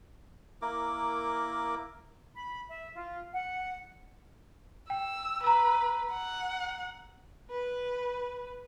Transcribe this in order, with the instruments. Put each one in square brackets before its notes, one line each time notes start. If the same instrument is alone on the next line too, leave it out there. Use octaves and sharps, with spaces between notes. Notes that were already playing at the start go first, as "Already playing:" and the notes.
[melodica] A#3 E4 A#4 D6
[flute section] B5
E5
F4
F#5
[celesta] G5 [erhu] E6
[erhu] B4 [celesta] A#5 E6
[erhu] F#5
[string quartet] B4